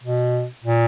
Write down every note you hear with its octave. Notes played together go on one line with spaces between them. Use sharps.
B2
A#2